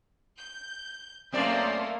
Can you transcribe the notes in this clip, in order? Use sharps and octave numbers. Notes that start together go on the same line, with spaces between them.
G6
F#2 A3 A#3 C4 D5 C6